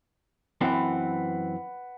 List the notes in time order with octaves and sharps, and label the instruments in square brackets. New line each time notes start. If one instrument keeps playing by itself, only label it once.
[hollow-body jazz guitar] F#2 E3 C4 [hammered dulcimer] B4 F#5